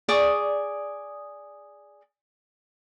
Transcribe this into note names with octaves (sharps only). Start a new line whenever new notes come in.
G#4 D5 C#6 D#6